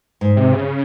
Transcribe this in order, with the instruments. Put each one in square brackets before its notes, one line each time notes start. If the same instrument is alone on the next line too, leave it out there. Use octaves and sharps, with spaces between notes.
[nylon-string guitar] G#2
[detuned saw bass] C3
C#3